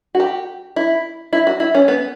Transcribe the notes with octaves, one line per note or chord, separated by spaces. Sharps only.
F#4
G4
E4
E4
F#4
E4
C#4
B3